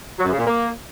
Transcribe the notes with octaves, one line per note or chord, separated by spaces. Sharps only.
F#3
F#2
C#3
A#2
A#3